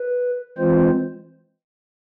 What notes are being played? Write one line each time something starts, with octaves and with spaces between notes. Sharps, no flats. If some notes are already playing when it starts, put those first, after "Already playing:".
Already playing: B4
E3 G#3 C4 F4 C5